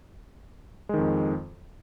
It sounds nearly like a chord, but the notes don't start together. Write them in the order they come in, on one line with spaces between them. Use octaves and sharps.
G#3 D#3 F2